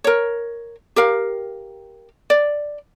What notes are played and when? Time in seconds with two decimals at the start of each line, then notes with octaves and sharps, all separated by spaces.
0.04 A#4 C#5
0.96 G4 A#4 F5
2.30 D5